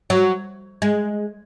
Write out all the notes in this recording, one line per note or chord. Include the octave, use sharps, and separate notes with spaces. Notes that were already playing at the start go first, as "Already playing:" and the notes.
F#3
G#3